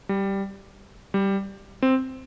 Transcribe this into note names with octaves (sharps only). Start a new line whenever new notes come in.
G3
G3
C4